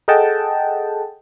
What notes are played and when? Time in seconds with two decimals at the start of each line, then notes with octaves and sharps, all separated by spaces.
0.08 G#4 A4 D#5 F#5 G5 A5